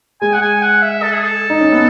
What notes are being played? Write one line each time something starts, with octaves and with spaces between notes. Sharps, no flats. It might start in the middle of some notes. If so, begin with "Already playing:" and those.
G#3 G#5
F#5
G#5
F#5
E5
A4
G#4
A4
D#4
C#4
B3